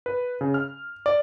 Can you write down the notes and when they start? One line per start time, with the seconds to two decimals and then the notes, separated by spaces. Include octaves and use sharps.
0.06 B4
0.41 C#3
0.54 F6
1.06 D5